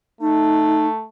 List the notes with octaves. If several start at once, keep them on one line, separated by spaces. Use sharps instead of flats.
A3 D#4